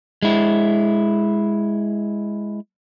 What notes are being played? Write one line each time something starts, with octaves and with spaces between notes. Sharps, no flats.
G#3 E4